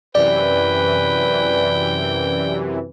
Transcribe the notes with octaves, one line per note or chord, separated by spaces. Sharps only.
F#2 C3 E3 B4 D5 G5